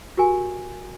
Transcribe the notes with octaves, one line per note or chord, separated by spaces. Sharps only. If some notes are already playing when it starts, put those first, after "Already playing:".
F#4 G4 A#4 G#5